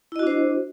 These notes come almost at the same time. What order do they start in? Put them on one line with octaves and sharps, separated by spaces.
E4 D#5 F#4 D4 C5